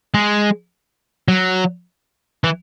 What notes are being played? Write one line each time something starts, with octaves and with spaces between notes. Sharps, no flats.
G#3
F#3
E3